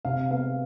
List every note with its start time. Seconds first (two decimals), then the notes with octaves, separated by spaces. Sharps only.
0.05 C3 F5
0.31 B3 F5